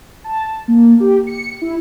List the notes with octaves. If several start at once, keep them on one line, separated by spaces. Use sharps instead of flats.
A5
A#3
G4
C#7
E4